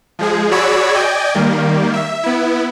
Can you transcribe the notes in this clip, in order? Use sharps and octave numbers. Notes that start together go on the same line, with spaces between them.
F3 G#3 G#4
F#4 G#4 C#5 D5 B5 E6
D5 D#5 G5 G#5
D#3 G3 A#3
E5
B3 E4